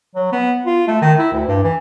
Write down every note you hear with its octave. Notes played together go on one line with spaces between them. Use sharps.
F#3
B3
F4
A3
D#3
E4
D2
G2
E3